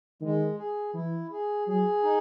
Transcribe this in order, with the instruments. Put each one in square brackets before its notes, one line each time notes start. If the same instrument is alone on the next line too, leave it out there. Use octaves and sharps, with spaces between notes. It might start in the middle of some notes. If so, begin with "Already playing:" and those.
[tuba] D#3 [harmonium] G#3
[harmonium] G#4
[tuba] E3 [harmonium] E4
[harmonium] G#4
[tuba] F#3 [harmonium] G#4
[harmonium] D#4